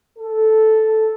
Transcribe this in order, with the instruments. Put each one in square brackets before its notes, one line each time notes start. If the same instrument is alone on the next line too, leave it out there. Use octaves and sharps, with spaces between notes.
[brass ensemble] A4